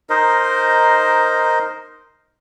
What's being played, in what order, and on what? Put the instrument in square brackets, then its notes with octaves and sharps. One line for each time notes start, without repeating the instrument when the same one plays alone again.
[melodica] D#4 A#4 C5 D#5